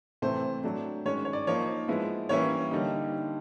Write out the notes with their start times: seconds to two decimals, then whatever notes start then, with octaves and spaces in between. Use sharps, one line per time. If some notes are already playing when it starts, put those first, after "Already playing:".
0.22 C3 E3 A3 C4 C5
0.63 F#3 A3 D4
1.05 D#3 G#3 C#4 C#5
1.25 C#5
1.33 D5
1.47 F3 A#3 D#4 C#5
1.88 F3 G#3 B3 E4
2.29 E3 G3 A#3 C#4 E4 C#5
2.71 D3 G3 A#3 D#4